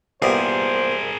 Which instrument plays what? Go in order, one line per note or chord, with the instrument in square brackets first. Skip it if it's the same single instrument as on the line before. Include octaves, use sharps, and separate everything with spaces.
[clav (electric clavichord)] C2 [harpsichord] A#2 B3 G4 [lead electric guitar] G#4 A#4 [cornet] C5